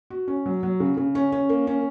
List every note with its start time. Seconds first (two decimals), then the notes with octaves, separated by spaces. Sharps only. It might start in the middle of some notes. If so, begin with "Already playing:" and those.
0.10 F#4
0.28 C#4
0.46 F#3
0.63 F#3
0.80 C#3
0.97 C#3
1.15 C#4
1.32 C#4
1.49 A#3
1.67 C#4